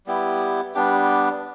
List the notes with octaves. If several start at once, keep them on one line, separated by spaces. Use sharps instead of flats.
G3 B3 E4 G4
G3 B3 D4 G4